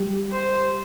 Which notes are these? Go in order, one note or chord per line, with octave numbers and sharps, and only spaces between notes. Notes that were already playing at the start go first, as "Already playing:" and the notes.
Already playing: G3 G4
C5